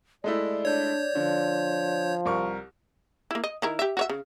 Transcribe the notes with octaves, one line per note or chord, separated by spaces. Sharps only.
G#3 A3 E4 D5
D4 C#5 G6
D3 F3
C2 A#4 C#6
A#3 E4
D#5
D#3 E4 A#4
G4 E5
F#4 C#5 E5
C#3